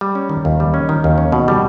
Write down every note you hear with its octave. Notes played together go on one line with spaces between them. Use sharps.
G3
C#4
D#3
D#2
G3
C#4
D#3
D#2
C#4
B2
G3